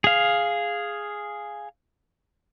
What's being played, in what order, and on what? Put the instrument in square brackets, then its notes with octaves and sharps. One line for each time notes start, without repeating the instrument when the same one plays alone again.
[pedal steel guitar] G#4 F5